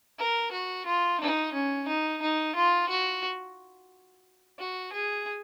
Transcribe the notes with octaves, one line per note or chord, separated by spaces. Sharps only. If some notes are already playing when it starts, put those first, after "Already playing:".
A#4
F#4
F4
D#4
C#4
D#4
D#4
F4
F#4
F#4
G#4